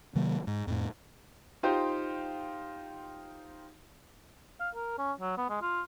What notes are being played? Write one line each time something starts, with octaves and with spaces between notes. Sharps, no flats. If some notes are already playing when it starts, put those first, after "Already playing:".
C3 D#3 F#3 A#3
G#2
F2 A2
D#4 F4 G4 C5
F5
A#4
C#4
F#3
B3
G#3
F4